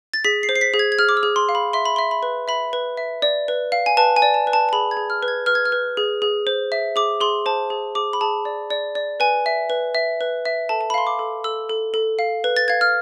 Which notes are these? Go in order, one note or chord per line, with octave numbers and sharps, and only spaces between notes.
A6
G#4 B6
C7
C5
C7
B6
G#4
G#6
G#6
G#4 F6
D6
E6
G#4
C6
F5
B5
E5 C6
B5
E5 C6
B5
B4
E5 B5
B4
E5
D5
B4
F5
G#5
B4 A5
G#5
D5
A5
B4
A5
A5
G#4 B5
G#6
G#4
F6
B4
G#6
B4 F6
G#6
F6
B4
G#4
G#4
C5
E5
G#4 D6
G#4 C6
C5 A5
G#4
G#4 D6
B5
G#4 A5
D5
D5
D5
B4 G#5
E5
B4
E5
B4
E5
A4 A5
A5
B5
F5 C6
D6
A4
A4 E6
A4
A4
F5
B4
A6
F5 G#6
F6